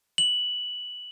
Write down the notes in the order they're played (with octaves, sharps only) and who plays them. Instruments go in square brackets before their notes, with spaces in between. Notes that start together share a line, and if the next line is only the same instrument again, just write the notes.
[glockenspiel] F#7